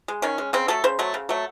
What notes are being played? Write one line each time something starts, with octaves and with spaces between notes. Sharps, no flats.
G#3
D#3 C#4
G#3
C#3 C4
F#3 A3 A4
C#3 C5
F#3 A3
C#3
F#3 A3